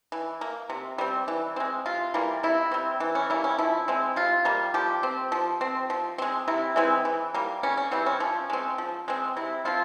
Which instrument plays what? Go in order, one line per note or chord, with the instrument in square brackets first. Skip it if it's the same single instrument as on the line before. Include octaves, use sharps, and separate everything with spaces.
[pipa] E3
A#3
C3
G3 C4
E3
G#3 C4
C3 F4
E3 G3 A#3
C3 E4
G3 C4
E3
C#4
G3 A#3 E4
C#4
F3 E4
G#3 C4
C3 F4
G3 A#3
F3 G4
C4
F3
C4
F3
G#3 C4
C3 E4
E3 G#3 C4
E3
G3 A#3
C#3 C#4
C#4
E3 G3 C4
C#4
F3 C#4
G#3 C4
F3
G#3 C4
C3 E4
F3 C4 F4